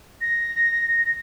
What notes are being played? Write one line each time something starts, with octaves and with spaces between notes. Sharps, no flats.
A#6